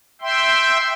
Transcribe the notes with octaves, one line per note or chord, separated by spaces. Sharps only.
E5 G5 C6